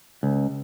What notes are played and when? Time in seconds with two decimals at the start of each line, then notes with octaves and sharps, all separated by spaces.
0.23 C#2